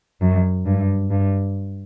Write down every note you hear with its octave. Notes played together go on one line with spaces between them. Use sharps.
F#2
G2
G2